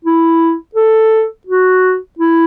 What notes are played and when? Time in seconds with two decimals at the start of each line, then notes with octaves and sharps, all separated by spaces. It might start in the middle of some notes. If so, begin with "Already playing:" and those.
0.05 E4
0.75 A4
1.47 F#4
2.19 E4